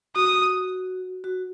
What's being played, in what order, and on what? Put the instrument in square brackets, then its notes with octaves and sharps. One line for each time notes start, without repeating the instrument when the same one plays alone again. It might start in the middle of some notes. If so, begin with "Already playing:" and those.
[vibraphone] F#4 [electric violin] D#6
[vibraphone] F#4